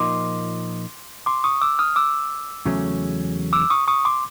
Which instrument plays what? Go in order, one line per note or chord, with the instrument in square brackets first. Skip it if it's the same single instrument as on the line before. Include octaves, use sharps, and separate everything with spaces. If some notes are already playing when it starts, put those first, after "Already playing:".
Already playing: [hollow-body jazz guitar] A#2 F3 A#3 D#4 [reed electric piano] C6 D6
[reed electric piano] C6 D6
C#6 D#6
D6 E6
D#6 F6
D6 E6
[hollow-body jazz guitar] E2 C#3 F#3 A3 C#4
[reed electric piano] D6 E6
C#6 D#6
C#6 D#6
C6 D6